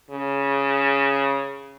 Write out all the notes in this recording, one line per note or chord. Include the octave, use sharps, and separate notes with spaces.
C#3